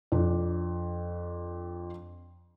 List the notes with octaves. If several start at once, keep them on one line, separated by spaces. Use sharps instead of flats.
F2 D4